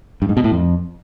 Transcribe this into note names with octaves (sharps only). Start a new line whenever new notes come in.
G2
G#2
B2
A2
F2